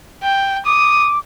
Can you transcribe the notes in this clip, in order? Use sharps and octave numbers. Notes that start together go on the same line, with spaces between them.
G5
D6 D#6